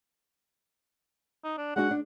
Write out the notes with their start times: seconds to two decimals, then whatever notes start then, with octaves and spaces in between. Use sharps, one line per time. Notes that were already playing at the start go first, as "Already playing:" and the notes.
1.44 D#4
1.58 D4
1.76 G#3 D4 F#4 F#5
1.91 D4